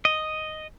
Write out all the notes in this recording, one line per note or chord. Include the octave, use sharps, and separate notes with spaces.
D#5